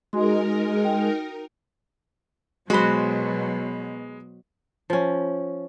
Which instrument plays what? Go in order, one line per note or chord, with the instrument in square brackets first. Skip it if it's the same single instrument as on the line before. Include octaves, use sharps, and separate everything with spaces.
[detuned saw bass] G#3 [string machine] D#4 A#4 [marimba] F#4 C6
[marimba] G5
[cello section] B2 F#3 [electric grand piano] G#3 B5 [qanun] F#4 C5
[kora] F3 C#4